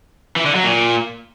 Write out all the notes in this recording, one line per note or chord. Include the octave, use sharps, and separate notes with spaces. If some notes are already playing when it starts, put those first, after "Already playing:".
E3
D3
F#3
A#2